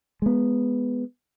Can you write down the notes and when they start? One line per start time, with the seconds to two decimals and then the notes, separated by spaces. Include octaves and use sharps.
0.22 G#3 B3